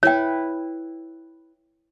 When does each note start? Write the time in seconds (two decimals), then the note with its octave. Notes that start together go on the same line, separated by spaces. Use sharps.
0.03 E4 B4 C#5 G5